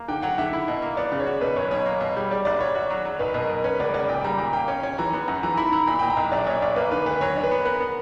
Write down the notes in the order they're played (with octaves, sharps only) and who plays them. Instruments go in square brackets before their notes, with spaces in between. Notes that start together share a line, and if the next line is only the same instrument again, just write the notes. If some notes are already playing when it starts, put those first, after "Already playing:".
Already playing: [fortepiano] A#3
[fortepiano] D3 [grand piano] G5
[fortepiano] F#3 [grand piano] F#5
[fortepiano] D3 [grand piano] E5
[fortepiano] E4
B2
A#3
[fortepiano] B3 [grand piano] D5
[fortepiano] C#3
[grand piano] C#5
[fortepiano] F#4
[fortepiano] B2 [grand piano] B4
[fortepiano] B1 [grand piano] C#5
[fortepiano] B2 [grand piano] C#5
[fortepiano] A#3
B2
G3
[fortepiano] G3 [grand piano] D5
[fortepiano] A#1 [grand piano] D5
[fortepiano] A#1 [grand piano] C#5
[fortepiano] F#4
F#3
F#3
[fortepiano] B1 [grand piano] B4
[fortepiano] B2
[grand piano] A#4
[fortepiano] B2
[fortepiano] C#4 [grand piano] B4
[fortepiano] C#2 [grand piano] D5
[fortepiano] C#2 [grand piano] D5
[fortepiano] A#2 [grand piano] G5
[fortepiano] G3 [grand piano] A#5
[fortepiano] A#2 [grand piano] A#5
[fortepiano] A#3 [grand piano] G5
[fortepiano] C#4
C#4
[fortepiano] E3 [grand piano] A#5
[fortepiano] B3
F#2
[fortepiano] E3 [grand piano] A#5
[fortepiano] E4 [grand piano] B5
[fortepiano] E4 [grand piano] A#5
[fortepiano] A#2 [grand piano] B5
[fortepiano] A#2 [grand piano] G5
[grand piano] A#5
[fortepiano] B1
[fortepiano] A#1 [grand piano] D5
[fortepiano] A#2 [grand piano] C#5
[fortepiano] A#1 [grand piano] D5
[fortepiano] A#3 [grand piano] B4
[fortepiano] D3 [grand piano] B4
[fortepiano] D2 [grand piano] B4
[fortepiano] F#3 [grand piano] C#5
[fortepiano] D4
[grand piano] B4
[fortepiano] B3
[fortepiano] B3 [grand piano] A#4
[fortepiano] B3